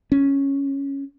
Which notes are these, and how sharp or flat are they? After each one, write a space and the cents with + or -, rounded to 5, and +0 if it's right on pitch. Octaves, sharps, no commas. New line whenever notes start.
C#4 -5